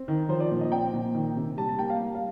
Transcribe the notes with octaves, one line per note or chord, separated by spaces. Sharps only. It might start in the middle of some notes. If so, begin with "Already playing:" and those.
Already playing: C4
D#3
F3 C5
D5
A#2
D#5
C4 G5
A#2
D#3
C3
G3 A5
A5
A#3 G5
F5
G3
F5